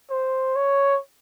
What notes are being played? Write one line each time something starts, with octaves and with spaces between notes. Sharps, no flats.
C5
C#5